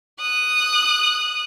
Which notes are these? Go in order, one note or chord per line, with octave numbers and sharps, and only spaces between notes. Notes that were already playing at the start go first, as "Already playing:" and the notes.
D#6 F#6